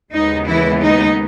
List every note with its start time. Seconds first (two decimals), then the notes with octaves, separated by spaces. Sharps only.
0.13 D#2 C#3 G#3 B3 D#4
0.48 E3 E4
0.82 D#4